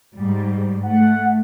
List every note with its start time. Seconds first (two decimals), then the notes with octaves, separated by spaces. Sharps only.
0.16 G#2 G3
0.83 A3 F#5